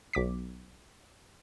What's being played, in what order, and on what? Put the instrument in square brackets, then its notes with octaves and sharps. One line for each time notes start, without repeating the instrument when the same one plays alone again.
[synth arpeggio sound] B1 D6 B6